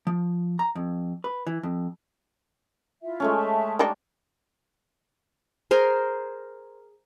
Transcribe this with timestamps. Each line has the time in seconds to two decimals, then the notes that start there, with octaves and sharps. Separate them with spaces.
0.07 F3
0.59 A#5
0.75 F2
1.24 B4
1.47 E3
1.63 F2
3.03 E4 F4 E5
3.20 G#3 A3 C#4
3.36 E5 A5
3.79 G3 D4 D#4
5.71 G#4 A#4 C5